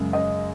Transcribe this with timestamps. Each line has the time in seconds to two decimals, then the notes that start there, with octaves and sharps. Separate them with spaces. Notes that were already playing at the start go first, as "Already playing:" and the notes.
Already playing: F#2 C#3 G#3
0.13 D#5